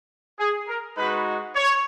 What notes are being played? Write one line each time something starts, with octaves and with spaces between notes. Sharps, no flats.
G#4
A#4
G#3 D#4 F#4 B4
C#5